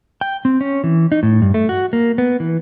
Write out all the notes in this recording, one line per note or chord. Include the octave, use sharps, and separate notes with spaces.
G5
C4
C#4
E3
D#4
A2
G2
A3
F#4
A#3
B3
E3